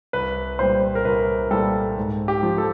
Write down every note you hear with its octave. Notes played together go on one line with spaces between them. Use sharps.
C2 B4
A#2 G3 C5
A#4
C2 B4
A#2 G3 A4
G#2
G4
F3
A4